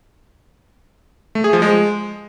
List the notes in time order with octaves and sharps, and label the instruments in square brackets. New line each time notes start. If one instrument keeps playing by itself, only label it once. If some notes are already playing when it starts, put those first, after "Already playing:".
[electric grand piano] A3
G#4
F3
G#3